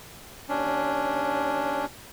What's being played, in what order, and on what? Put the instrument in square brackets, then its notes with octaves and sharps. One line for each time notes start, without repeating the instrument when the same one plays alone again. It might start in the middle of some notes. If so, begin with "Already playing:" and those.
[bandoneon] D#2 C#4 D4